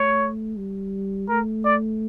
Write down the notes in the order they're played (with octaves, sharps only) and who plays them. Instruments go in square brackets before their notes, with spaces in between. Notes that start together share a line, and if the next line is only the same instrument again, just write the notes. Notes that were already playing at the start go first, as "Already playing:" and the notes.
Already playing: [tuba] A3 [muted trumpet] C#5
[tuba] G3
[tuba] A3 [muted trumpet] A#4
[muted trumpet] D5